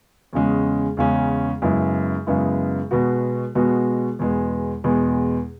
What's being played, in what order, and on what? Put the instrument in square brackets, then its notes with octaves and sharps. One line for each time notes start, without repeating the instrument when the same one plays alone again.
[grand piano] E2 C#3 G#3 C#4
E2 C#3 G#3 C#4
F#2 C#3 G#3 B3 E4
F#2 C#3 G#3 B3 E4
B2 G#3 B3 F#4
B2 G#3 B3 F#4
E2 B2 G#3 B3
E2 B2 G#3 B3